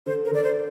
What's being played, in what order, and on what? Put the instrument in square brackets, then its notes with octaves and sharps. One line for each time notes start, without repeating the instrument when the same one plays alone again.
[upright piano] D3 [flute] C5
[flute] A#4
[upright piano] D3 [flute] D5
[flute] C5